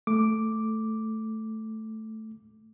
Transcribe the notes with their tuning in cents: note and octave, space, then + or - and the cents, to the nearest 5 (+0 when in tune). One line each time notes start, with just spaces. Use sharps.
A3 +0 D6 +0